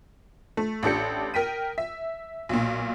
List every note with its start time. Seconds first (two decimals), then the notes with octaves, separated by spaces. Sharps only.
0.57 A3
0.83 A1 D4 G4 A4 G6 C#7
1.34 A#4 G5 B6 D#7
1.78 E5
2.49 B1 A#2